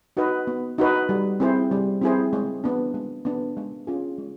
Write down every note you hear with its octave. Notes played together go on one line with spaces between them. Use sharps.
D#4 F#4 B4 D#5
B3
D#4 F#4 B4 D#5
G3
C4 E4 G#4 C5
G3
C4 E4 G#4 C5
G#3
B3 D4
G#3
B3 D4
G#3
C#4 F4 G#4
G#3